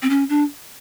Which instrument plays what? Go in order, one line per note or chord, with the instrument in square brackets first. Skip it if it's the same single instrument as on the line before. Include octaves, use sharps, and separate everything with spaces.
[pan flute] C4
C#4
D4